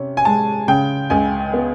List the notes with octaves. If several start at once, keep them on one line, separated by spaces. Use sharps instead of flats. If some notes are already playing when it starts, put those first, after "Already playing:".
Already playing: C3 C#4
G#5
G#3 A5
C#3 G5
C#2 G#5
B3